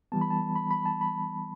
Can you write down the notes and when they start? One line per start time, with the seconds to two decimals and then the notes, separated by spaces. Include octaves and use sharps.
0.12 E3 G3 B3 A5
0.21 B5
0.30 A5
0.56 B5
0.71 B5
0.86 A5
1.01 B5